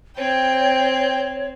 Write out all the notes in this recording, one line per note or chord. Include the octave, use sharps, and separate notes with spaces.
C4 C#5 G5